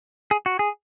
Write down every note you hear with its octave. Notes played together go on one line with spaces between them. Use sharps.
G#4
F#4
G#4